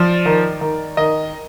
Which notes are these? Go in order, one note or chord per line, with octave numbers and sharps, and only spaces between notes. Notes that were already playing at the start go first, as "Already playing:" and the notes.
Already playing: F3 D5
D#3
D#3
D#3 D#5